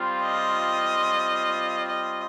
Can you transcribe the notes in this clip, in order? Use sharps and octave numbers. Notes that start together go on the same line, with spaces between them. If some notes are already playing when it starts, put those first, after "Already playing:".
Already playing: G3 C4 F4
D#5
D#5